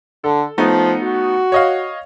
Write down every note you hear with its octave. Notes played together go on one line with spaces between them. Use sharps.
D3 A4
F3 A3 B3 D#4
F#4
C#5 D#5 F5